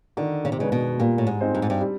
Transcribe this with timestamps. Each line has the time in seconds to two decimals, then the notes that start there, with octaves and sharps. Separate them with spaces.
0.17 D3 D#3
0.45 C#3
0.52 C3
0.58 C#3 G#3 B3 D4
0.72 B2
0.99 A#2 G3
1.18 A2
1.27 G#2
1.41 C4 D#4 G#4 C5
1.55 G2
1.62 G#2
1.70 G2
1.81 G3